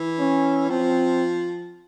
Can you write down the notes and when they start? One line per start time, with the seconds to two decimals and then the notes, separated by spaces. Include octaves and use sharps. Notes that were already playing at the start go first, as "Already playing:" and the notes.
Already playing: E3
0.19 C#4
0.70 F3 C4